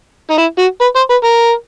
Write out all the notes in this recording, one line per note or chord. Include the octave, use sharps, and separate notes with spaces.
D#4
E4
F#4
B4
C5
B4
A#4